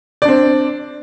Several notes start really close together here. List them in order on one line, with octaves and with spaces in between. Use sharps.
D5 D4 C4